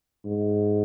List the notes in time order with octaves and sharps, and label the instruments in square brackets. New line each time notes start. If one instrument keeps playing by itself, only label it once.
[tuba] G#2